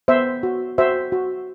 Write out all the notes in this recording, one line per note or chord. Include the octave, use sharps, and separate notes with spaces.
B3 C5 E5
F#4
F#4 C5 E5
F#4